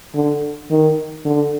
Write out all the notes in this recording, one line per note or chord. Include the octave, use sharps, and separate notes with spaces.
D3
D#3
D3